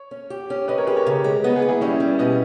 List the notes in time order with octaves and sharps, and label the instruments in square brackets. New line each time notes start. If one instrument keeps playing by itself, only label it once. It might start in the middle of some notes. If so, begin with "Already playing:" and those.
Already playing: [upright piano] C#5
[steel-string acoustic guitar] C#4
G4
C#4
[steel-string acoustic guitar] C#4 [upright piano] B4 D#5
[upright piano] A#4 C#5
[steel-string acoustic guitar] G4 [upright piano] G#4 B4
[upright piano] A#4 C#5
[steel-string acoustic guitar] C#3
G#3
[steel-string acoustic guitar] B3 [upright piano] B4 D#5
[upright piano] G#4 B4
[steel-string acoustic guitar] D#2
[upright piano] E4 G#4
[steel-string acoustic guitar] G3 [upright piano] C#4 E4
[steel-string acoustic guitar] G3
[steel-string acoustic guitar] B2 [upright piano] B4 D#5